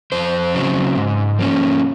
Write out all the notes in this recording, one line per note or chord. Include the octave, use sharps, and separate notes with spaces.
F2 C5
C#3 F#3 C4
G#2
F3 A#3 C#4